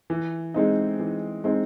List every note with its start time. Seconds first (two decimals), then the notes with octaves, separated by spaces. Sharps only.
0.10 E3
0.54 G#3 C4 D#4
0.99 E3
1.44 G#3 C4 D#4